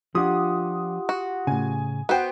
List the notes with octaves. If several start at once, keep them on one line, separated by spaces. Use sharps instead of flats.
F3 D4 F4 G4 F#5 D#6
F#4
A2 C#3 G#5
B3 F#4 C5 G5